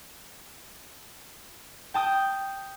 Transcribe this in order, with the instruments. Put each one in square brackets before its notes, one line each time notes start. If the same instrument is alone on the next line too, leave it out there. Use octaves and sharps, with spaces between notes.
[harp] G5 A5 D#6 G6